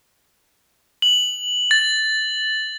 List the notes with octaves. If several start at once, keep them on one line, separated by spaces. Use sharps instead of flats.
F#7
A6